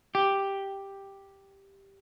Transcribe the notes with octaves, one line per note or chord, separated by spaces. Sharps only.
G4